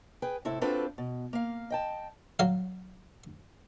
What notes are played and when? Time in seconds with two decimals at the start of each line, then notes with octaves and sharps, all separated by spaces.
0.22 G#4 B4 G5
0.45 A2 C3 E4 A4
0.61 C4 D4 F4 F#4 A4 B4
0.98 B2
1.33 A#3 F5
1.70 D#5 G5 A5
2.39 F#3 F5